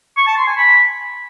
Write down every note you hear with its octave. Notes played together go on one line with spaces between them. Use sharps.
C#6
A5
C6
G#5
B5